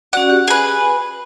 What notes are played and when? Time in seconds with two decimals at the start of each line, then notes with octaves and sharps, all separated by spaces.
0.13 C#4 F#4 D5 F#5
0.30 G4
0.48 G#4 B4 G#5